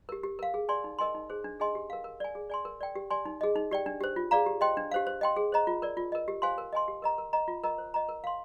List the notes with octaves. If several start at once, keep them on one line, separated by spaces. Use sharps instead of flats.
G4 A#4
G4
A#4 F5
G#4
D5 G#5 C6
D#4
A#4 D#5 G#5 C6
D#4
G#4 C5
D4
G#4 D#5 G#5 C6
G4
A#4 F5
A#4
D5 G#5
G#4
D5 G#5 C6
A#4
D5 G5
G4
D5 G#5 C6
D#4
G#4 D#5
D#4
G4 D5 G5
D4
G4 C5
F4
G#4 D5 F5 A#5
G4
C5 D#5 G5 C6
D4
G4 C5 F5
C5
D#5 G5 C6
G#4
C5 D#5 A#5
F4
A#4 D5
F4
A#4 D#5
G4
C5 F5 G#5 C6
A#4
D#5 G#5 C6
G4
A#4 D#5 A#5
A#4
D#5 A#5
F4
A#4 D#5 A#5
C5
D#5 A#5
A#4
F5 C6